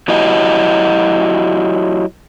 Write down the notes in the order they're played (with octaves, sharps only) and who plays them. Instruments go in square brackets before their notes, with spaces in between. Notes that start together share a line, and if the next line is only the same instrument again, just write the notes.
[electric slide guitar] F#3 E4 F#4 G4 D#5